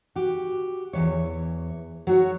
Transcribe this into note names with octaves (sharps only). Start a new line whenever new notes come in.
F#4 G4
E2 A#2 E3 C#5
F#3 F#4 C#5